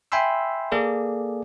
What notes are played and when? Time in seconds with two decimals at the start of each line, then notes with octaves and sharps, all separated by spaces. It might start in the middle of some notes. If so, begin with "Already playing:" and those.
0.12 E5 G5 G#5 B5 C6 E6
0.72 A#3 G#4 A4 D5